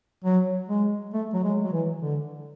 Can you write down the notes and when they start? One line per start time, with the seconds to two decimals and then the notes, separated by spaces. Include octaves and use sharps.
0.25 F#3
0.69 G#3
1.13 A3
1.34 F#3
1.44 G#3
1.64 F#3
1.72 E3
2.02 D3